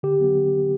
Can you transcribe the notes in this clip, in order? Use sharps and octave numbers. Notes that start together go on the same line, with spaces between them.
D3 G4
F#3 B3